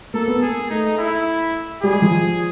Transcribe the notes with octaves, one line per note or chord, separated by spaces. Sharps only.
A#3 A4
B3
A#3 G#4
A3 D#4
E4
G3 G#4
G#3
F3